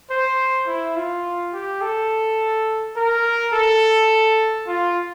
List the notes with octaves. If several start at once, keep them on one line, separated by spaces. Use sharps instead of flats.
C5
E4
F4
G4
A4
A#4
A4
F4